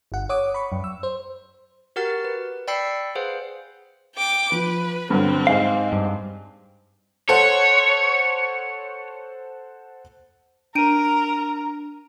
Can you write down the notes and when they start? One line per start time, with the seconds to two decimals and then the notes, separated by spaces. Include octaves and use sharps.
0.12 G1 F#5
0.29 C#5 F#5 D6 D#6
0.54 B5 C#6
0.72 F#2
0.84 E6
1.03 C5
1.96 F#4 G4 A#4 F#5 F6 A6
2.25 B4
2.68 D5 G5 B5 E6 C7 C#7
3.15 G#4 B4 C5 F5 F#5
4.16 G5 D6
4.52 F3 B4
5.10 G2 D3 F#3 C4
5.47 G#2 G#4 C5 F5
5.92 G2
7.29 A4 C5 C#5 F#5
10.75 D4 A#4 A#5 D7 D#7